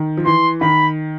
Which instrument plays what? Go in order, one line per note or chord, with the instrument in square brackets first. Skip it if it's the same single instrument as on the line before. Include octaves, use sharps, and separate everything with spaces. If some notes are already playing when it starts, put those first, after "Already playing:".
Already playing: [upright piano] D#3
F3
[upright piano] E3 [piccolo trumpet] C6
[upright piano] D#3 [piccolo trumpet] B5